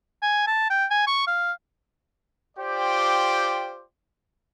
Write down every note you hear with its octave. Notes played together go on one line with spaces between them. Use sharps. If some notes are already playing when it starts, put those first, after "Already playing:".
G#5
A5
G5
G#5
C#6
F5
F4 G4 C5 D5 G5 D6